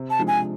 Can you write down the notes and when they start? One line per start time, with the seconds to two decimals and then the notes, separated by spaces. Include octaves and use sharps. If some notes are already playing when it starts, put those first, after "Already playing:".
Already playing: C3
0.10 A5
0.19 F3 G#3 D4
0.28 G#5